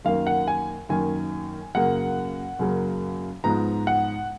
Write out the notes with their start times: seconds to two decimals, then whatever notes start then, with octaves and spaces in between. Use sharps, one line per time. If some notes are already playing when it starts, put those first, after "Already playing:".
0.05 F#2 D#3 A#3 F5
0.27 F#5
0.48 G#5
0.89 F#2 D#3 A#3 G#5
1.75 F#2 C#3 F#3 A#3 F#5
2.59 F#2 C#3 F#3 A#3
3.44 G#2 F3 B3 A#5
3.87 F#5